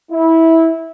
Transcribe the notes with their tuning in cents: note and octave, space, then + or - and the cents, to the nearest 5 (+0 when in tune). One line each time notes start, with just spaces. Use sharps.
E4 -15